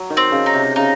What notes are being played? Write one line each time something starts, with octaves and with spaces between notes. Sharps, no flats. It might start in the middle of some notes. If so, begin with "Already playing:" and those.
Already playing: F#3
D#3
C4
C#3
D#4
C3
C#3 D#4